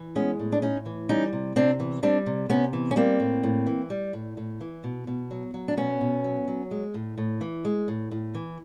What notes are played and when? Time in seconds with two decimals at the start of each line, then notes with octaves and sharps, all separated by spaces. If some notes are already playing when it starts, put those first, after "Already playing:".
Already playing: E3
0.15 G#3 B3 C#4
0.39 A2
0.52 D4
0.62 A2 C#4 D#4
0.86 E3
1.09 G3 C#4 D#4
1.33 C3
1.56 C3 C4 D4
1.80 E3
2.03 G3 C4 D4
2.26 C3
2.49 C3 B3 C#4
2.73 E3
2.91 C#4
2.96 G3 A#3 C4
3.20 A2
3.43 A2
3.67 E3
3.90 G3
4.13 A2
4.37 A2
4.61 E3
4.84 B2
5.07 B2
5.31 F#3
5.54 F#3
5.68 D4
5.77 B2 B3 C#4
6.01 B2
6.24 F#3
6.48 F#3
6.71 G#3
6.94 A2
7.18 A2
7.41 E3
7.65 G#3
7.88 A2
8.11 A2
8.34 E3